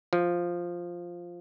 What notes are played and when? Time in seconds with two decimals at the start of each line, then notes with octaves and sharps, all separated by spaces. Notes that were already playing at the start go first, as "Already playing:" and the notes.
0.13 F3